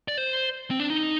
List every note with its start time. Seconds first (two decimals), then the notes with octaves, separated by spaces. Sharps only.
0.08 D5
0.18 C5
0.70 C4
0.80 D4
0.90 D#4